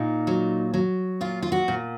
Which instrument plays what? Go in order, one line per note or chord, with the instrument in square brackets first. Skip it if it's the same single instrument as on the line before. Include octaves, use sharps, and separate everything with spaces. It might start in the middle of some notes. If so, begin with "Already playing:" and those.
Already playing: [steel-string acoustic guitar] A#2 D#4
F#3
F#3
A#2 F4
F4
F#4
A#2